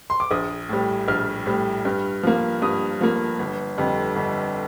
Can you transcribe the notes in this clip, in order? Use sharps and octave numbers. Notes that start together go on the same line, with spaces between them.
C6
D6
A#1 D#6
A2 G3
A#1 F6
A2 G3
G2
F3 A#3
G2 D#6
F3 A#3
G1
F2 D3 G3
G1